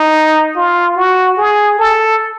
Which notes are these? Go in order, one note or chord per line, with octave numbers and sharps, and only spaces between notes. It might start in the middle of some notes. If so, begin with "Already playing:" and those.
Already playing: D#4
F4
F#4
G#4
A4